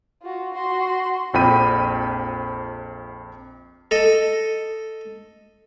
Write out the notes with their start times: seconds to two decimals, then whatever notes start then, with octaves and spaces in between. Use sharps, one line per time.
0.22 F4 F#4
0.53 F#4 C6
1.34 A#1 F2 G5 B5 D#7
3.91 A4 D#5